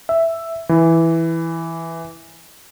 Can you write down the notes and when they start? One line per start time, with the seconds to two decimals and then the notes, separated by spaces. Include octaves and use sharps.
0.09 E5
0.69 E3